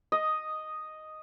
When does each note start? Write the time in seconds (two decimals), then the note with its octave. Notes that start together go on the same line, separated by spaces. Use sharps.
0.12 D#5